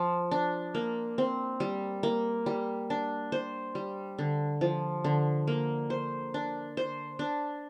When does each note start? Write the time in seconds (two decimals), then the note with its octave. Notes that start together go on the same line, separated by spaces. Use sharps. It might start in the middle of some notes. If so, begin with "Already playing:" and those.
Already playing: F3
0.31 D4
0.75 A#3
1.18 C4
1.60 G3
2.03 A#3
2.46 G3
2.90 D4
3.32 C5
3.75 G3
4.19 D3
4.61 F3
5.04 D3
5.47 A#3
5.90 C5
6.34 D4
6.77 C5
7.19 D4